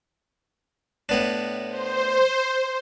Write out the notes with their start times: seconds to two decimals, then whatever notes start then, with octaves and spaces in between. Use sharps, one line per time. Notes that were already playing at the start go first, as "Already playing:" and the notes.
1.09 A2 B3 D4
1.69 C5